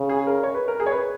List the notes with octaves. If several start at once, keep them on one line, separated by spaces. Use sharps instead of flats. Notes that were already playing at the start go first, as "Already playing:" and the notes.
Already playing: C#3
G#4
A#4
C#5
B4
A#4
G#4
C#5
B4